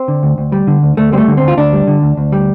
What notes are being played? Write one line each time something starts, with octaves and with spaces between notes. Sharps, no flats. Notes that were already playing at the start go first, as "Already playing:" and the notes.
Already playing: C4
D3
D2
D2
G3
D3
D2
D2 A3
G3 C4
A3
D3
C4
D2
F4
D2 D4
G3
D3
D2
D2
G3